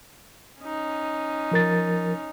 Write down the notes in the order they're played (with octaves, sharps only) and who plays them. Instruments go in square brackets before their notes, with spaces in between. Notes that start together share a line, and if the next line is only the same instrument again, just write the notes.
[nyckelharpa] C#4 D#4
[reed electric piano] F3 A#4 A6